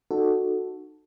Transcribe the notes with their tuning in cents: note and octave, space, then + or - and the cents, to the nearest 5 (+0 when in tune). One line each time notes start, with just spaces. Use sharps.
D#4 -35 F#4 +0 A4 +0